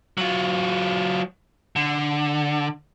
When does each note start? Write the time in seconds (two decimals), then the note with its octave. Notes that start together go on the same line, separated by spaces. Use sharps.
0.18 F#3 F4
1.76 D3